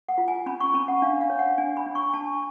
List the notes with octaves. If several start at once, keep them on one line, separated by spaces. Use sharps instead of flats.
F#5
F4
G#5
C#4 B5
C#6
C#4 B5
F#5
D4 F5
F5
C#5
F#5
D4 G#5
B5
D4
C#6
D4 A5